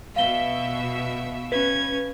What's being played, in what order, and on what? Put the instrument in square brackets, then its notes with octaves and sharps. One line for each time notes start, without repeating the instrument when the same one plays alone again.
[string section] B2 E5 [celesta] F5 G7
[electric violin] C#4 G#6 [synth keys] B4